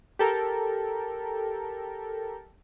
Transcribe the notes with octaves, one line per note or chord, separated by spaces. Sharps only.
G4 A4 A#4